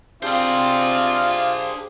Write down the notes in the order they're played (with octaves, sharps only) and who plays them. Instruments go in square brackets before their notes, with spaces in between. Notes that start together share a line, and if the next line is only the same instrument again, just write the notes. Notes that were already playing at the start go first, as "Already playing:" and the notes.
[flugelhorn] C4 [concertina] D4 G4 G#4 [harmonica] F4 [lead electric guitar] C5 D5